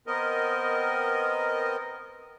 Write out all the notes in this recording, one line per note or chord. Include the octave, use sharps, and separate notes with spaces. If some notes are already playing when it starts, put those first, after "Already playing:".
B3 C4 A#4 D#5